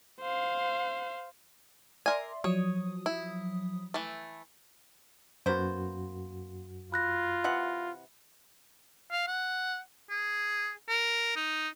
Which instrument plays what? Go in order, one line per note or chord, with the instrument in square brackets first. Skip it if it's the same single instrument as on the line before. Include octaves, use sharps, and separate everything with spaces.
[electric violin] C5 F5
[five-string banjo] A#4 G#5 [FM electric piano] D5 E5 C6
[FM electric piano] F3 F#3 D#6 [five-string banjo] C#5
[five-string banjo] E4
E3 A3
[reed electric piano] F#2 F#4 [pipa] A#3 B3 C5
[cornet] F4 [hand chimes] B5 F#6 A#6
[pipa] C3 E3 F#5
[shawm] F5
F#5
G#4
A#4
D#4